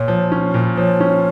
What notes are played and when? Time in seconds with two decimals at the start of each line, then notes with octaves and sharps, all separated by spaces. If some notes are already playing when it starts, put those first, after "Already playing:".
Already playing: A#2 C#5
0.08 F3
0.32 C#4
0.54 A#2
0.77 F3 C#5
1.00 C#4